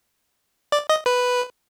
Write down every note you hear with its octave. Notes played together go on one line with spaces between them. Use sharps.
D5
D#5
B4